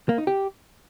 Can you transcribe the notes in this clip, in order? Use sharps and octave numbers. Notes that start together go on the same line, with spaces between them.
A#3
D#4
G4